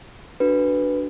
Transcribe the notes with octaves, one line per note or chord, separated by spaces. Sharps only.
D4 F#4 A4 B4